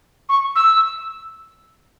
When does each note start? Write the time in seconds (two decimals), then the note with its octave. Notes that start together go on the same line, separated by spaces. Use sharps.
0.29 C#6
0.55 E6